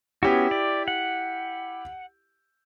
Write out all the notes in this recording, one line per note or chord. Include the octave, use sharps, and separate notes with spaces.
B3 C#4 E4 F#4 G4
D5
F#5